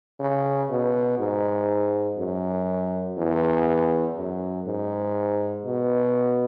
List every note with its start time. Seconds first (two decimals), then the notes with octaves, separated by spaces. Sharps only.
0.20 C#3
0.69 B2
1.19 G#2
2.18 F#2
3.17 E2
4.16 F#2
4.66 G#2
5.65 B2